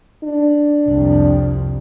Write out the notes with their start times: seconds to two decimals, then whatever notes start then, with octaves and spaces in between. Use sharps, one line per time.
0.24 D4
0.88 C2 F2